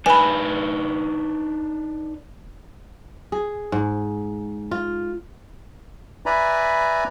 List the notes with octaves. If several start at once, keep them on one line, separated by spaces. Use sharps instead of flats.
D4 D#4 B4 G#5 B5
G#4
G#2
F4
B4 D5 E5 G#5 A#5 B5